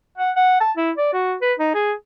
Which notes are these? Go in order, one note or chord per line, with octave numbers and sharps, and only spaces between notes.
F#5
F#5
A5
E4
D5
F#4
B4
D#4
G#4